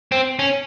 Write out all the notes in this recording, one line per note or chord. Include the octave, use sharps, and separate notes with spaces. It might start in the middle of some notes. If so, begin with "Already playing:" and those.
C4
C#4